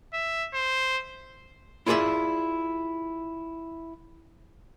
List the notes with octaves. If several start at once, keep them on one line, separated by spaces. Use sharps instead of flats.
E5
C5
E4 F4 G#4 A4 D5 E5